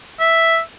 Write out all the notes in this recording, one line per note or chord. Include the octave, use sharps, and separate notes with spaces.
E5